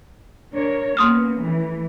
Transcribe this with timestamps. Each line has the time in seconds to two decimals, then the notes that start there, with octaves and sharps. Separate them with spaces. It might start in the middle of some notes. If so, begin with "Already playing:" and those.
0.53 D4 A#4 C#5
0.97 A#3 B3 C#4 C6 D#6 F6
1.41 E3 A3